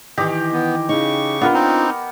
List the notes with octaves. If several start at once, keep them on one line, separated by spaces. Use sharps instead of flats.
D#3 E3 G4 D#5
B3
C#3 D#4 C#6
B3 D4 F4 A#4
C4 D#4